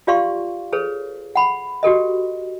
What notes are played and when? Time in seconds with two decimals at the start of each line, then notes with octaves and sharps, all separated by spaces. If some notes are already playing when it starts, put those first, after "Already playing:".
0.07 F4 G4 D5 F5 C6 C#6
0.73 G#4 A4 B4 C#5
1.36 F#5 B5
1.83 F#4 G4 A4 D#5